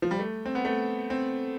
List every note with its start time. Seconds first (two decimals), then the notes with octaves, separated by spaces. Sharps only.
0.02 F3
0.11 G3
0.19 A3
0.45 C4
0.55 B3
0.65 A3
1.10 C4